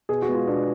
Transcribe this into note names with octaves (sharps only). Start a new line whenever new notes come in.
B2 G#4
F#4
G#3 B3
F4
B2 D4